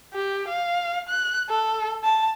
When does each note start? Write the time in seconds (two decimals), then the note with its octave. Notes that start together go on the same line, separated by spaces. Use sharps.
0.14 G4
0.48 F5
1.09 F#6
1.50 A4
2.04 A5